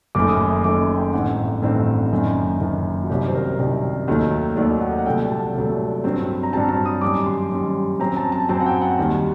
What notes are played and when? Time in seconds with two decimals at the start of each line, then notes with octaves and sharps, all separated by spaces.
0.15 F#1 F#2 D#3 A3 D6
0.29 D#6
0.40 D6
0.56 C6
0.64 F#1 F#2 D#3 A3 D6
0.97 G5
1.13 A1 G2 D#3 A3 C4 F#5
1.62 A1 G2 D#3 A3 C4
2.12 F#1 F#2 D#3
2.60 F#1 F#2 D#3
3.04 F#4
3.10 C2 C3 D#3 F#3 G4
3.28 C5
3.35 A#4
3.59 C2 C3 D#3 F#3
4.08 D#2 D#3 F#3 A3
4.56 D#2 D#3 F#3 A3 D5
4.81 F#5
4.90 D#5
4.98 F#5
5.06 C2 A#2 F#3 A3 G5
5.31 A5
5.55 C2 A#2 F#3 A3
6.04 G2 F#3 C4
6.43 A#5
6.52 G2 F#3 C4 A5
6.69 A5
6.86 D#6
7.01 F#2 D#3 G3 D6
7.26 C6
7.51 F#2 D#3 G3
8.00 F#2 F#3 C4 A#5
8.17 A5
8.32 A5
8.49 F#2 F#3 C4 A5
8.60 F#5
8.66 G5
8.81 F#5
8.98 D#2 D#3 G3